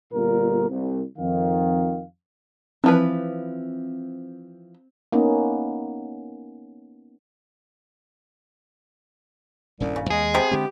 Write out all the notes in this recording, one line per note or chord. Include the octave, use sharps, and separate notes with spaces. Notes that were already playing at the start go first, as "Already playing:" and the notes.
G1 A#2 A#4
C2
F2 D#3 F5
E3 F3 C4 B4
A#3 B3 C#4 D#4
D#1 C2 G2 C#4
C#3
D#2 G#3 G#4
C3 B3
D3 G#3 C4 G4